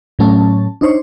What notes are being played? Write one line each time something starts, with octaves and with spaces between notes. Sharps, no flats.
A2 F#3 A3 C#4 A5
D4 D#4 C5 C#5